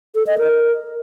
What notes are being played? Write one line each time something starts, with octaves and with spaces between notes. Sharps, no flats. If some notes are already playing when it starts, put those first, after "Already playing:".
A4
D#5
A#4